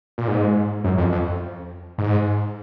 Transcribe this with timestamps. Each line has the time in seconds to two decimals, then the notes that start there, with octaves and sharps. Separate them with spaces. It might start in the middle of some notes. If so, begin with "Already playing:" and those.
0.18 A#2
0.28 G#2
0.84 F#2
0.98 F2
1.12 F2
1.98 G#2